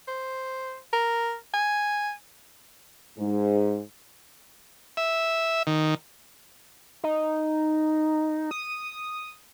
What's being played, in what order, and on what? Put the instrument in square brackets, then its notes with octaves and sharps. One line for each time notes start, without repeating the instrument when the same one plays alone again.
[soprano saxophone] C5
A#4
G#5
[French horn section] G#2
[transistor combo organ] E5
D#3
[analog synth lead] D#4
D#6